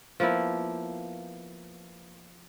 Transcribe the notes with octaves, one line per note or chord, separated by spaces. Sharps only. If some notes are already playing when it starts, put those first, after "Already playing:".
F3 A#3 B3 E4